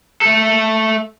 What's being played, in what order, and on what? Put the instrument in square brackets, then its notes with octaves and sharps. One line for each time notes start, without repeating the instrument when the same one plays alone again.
[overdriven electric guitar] A3 A4